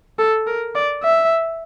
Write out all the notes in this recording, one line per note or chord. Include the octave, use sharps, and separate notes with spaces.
A4
A#4
D5
E5